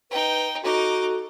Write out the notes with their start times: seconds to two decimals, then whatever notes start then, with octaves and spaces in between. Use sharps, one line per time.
0.10 D#4 B4 G5
0.63 D#4 F#4 A4 D6